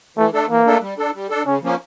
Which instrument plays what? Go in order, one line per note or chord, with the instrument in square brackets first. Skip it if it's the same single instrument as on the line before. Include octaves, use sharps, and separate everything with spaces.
[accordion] E3 [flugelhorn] A3
[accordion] A3 D4 A4
[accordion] E3 [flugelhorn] A#3
[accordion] A3 D4 A4
G3
D4 A4
G3
D4 A4
[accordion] C#3 [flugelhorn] C#4
[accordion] F3 A#3 C#4